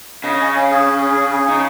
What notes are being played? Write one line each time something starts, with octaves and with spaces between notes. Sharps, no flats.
C#3 D#5
C#4
C#4
G#4
C#4
G#4
C#4
G#4
C#3 D#4